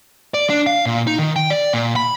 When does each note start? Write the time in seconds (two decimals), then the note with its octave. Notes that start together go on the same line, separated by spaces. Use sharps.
0.34 D5
0.50 D4
0.66 F5
0.86 A#2
1.07 D#4
1.19 D#3
1.36 G5
1.50 D5
1.74 A#2
1.96 B5